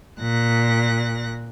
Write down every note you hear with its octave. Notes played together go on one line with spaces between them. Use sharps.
A#2 F#6 A#6